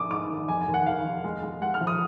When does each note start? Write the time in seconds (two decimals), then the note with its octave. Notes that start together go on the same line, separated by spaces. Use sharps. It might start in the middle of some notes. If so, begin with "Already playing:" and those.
Already playing: A#1 G#2 D6 D#6
0.11 G#2 D6
0.30 D#3
0.48 F1 G#5
0.61 G#5
0.68 D#2
0.74 F#5
0.86 D#3 F5
1.05 F1
1.24 G#3
1.43 G#3
1.62 G#3 F#5
1.74 F6
1.81 F3
1.87 D#6